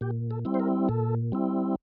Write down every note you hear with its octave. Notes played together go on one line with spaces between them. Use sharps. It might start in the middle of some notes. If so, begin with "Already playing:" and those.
A#2 G4
A4
G3 C4 E4
C5
A#4
A#2 A4
G3 C4 E4